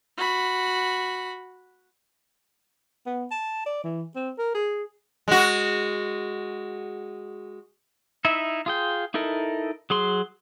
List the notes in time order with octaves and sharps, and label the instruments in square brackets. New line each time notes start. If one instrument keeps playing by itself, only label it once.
[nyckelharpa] F#4 B5
[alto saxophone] B3
A5
D5
E3
C4
A#4
G#4
[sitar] G#3 F#4
[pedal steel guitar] D#4 E4 E5
F4 G#4 G5
D#4 E4 A4 A#4
F#3 G#4 C6